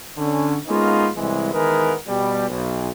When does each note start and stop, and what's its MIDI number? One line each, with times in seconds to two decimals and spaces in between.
0.17 0.56 50
0.17 0.56 61
0.67 1.07 56
0.67 1.07 58
0.67 1.07 59
0.67 1.07 61
0.67 1.07 63
0.67 1.07 65
1.15 1.51 36
1.15 1.51 52
1.15 1.51 56
1.52 1.93 51
1.52 1.93 52
1.52 1.93 56
1.52 1.93 59
1.52 1.93 70
2.07 2.48 47
2.07 2.48 55
2.48 2.90 35